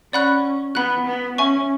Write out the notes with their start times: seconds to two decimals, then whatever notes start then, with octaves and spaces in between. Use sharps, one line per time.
0.13 C#4 D5 F#5 B5 F#6
0.75 B3 F#5 B5 F#6
1.06 B3
1.38 C#4 E5 G#5 C#6